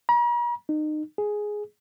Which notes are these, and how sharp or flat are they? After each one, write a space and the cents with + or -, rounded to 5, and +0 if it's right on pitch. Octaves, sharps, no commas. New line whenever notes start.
A#5 +45
D#4 -30
G#4 +5